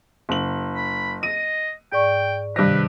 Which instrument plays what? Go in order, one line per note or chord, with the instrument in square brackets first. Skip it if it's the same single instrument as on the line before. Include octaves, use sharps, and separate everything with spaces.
[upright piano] F#1 F#7
[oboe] B5
[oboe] D#5 [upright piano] D#7
[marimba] G#2 D5 C#6 [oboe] G5
[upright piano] G2 A#6 [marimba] C3 D#3 [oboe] B4